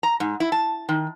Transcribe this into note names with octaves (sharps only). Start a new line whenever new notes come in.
A#5
G#2
E4
A5
D#3